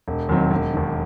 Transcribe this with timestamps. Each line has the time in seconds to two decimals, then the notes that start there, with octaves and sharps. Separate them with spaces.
0.08 E1
0.29 D#2 D#3 F#3 C4
0.51 E1
0.74 D#2 D#3